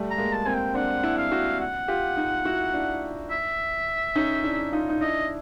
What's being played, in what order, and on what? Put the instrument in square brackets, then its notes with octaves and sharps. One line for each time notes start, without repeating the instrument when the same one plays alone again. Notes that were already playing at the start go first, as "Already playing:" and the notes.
Already playing: [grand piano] G3 A3
[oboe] A#5
[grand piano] G#3 A#3
[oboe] A5
[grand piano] A#3 C4 [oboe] G#5
[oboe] G5
[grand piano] C4 D4 [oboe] F#5
[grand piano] D4 E4
[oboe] F5
[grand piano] E4 F#4
[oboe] F#5
[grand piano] F4 G4
D#4 F4
E4 F#4
D4 E4
[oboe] E5
[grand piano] C#4 D#4
D4 E4
D#4 F4
D#4
[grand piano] D4 E4 [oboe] D#5